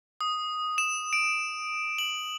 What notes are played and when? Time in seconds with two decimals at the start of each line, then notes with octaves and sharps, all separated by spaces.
0.21 D#6
0.78 E7
1.13 D7
1.98 F#7